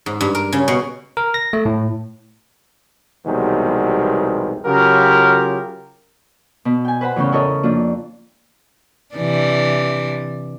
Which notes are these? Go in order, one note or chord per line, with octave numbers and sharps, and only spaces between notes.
G#2
G2
A#4
C#3
B2
A#4
A#6
A3
A2
B1 E2 C3 D#3 G3 G#3
C#3 F#3 F4 G4 A#4
B2
G5 G#5
B4 C5 F#5 B5
E2 A2 C#3 C#4 C#5 G6
E4 A4 A#4 C#5 D#5
F2 A#3 D4 F4
C3 E3 D4